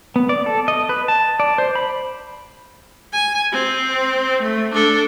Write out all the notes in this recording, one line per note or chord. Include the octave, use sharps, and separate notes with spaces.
B3
D5
A4
D#5
B4
A5
D5
C5
B5
G#5
C4
A3
D4 A4